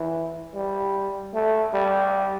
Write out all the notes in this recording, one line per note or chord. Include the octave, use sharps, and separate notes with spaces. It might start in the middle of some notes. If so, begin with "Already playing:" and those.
Already playing: E3
G3
A3
G3